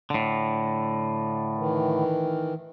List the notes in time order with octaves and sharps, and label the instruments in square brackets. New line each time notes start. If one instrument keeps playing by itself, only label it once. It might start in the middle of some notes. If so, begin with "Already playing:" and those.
[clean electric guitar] A2 D3
[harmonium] D#3 E3